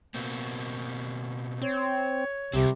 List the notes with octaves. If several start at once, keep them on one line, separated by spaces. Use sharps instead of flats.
B2 A#3 C4
C4 C#5
C2 C3 G3 C4